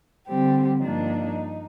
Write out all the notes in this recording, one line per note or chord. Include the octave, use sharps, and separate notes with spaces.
D3 G3 C4 G4
G2 F3 A#3 D4 D#4